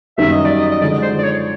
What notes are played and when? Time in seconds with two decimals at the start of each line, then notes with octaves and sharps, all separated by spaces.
0.18 F#2 D#3 G3 E5
0.32 D#5
0.45 D5
0.59 D#5
0.72 D#5
0.81 D3 F3 G#3 D5
1.03 C5
1.19 D5
1.24 C#5